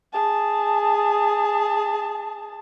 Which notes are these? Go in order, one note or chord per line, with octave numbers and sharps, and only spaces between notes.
G#4 A5